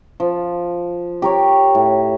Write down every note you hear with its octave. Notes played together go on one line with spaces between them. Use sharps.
F3
G4 A#4 C#5
A2